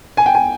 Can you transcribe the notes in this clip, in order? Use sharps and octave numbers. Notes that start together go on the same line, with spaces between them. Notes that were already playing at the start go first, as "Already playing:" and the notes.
G#5
G5
G#5